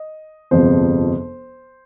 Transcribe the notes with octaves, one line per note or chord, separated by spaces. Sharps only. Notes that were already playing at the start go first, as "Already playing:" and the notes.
Already playing: D#5
G1 F2 C3 F3 G#3 C5